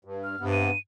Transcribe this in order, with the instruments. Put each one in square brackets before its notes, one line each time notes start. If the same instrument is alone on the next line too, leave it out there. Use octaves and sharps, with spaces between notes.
[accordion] G2
[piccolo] F6
[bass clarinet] G2 [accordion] C3 B3
[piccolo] D#7